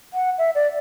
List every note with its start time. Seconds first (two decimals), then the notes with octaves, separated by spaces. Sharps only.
0.14 F#5
0.38 E5
0.55 D5